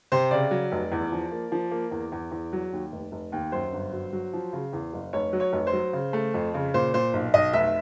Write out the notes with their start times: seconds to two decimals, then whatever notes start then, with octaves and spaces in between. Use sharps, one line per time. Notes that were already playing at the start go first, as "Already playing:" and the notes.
0.12 C3 C5
0.31 C#3 D5
0.51 F#3
0.72 F1
0.92 E2
1.12 F3
1.31 A#3
1.52 F3
1.71 A#3
1.91 E2
2.12 E2
2.31 E2
2.53 F#3
2.72 D#2
2.92 F1
3.12 F1
3.32 D#2
3.52 F#2 C5
3.72 G1
3.93 F#3
4.13 F#3
4.33 F3
4.53 C#3
4.73 E2
4.93 F#1
5.13 F1 C#5
5.33 F#3
5.40 C#5
5.53 F1
5.67 C5
5.73 F#3
5.93 C#3
6.13 A3
6.34 F2
6.54 C#3
6.74 A#2 C5
6.94 A#2 C5
7.13 B1
7.34 B1 D#5
7.53 F1 E5